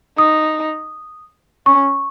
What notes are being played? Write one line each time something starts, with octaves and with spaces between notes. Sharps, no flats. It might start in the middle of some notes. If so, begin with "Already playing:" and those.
D#4 D#6
C#4 C#6